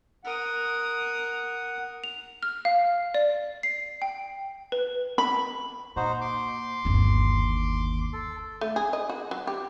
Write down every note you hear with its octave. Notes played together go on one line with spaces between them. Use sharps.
A#4 F#5 D#6
F7
F6
F5
D5
C7
G5
B4
B5
A#2 D#4 F#4 C5
C6 D6
G1 D#2
A4
A3
G#4
D#5
F#4
F#3
G4